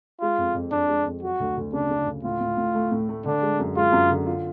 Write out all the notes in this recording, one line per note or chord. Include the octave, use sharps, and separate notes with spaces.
G#3 F4
F2
F2
F2 D4
G#3
F2
F#3 F#4
D2
D2
C#3 D4
C#3
D2
A2 F4
A2
A2
A3
A2
A3
D3 D4
G#3
F#2
G#3 F4
F#2
D3
F4